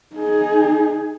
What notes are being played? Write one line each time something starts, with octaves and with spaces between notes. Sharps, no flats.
D#4 G#4